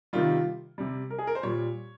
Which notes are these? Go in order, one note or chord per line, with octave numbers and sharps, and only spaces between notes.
C3 D#3 G3 F4
C3 G3
A#4
G#4
A#4
C5
A#2 G3 C#5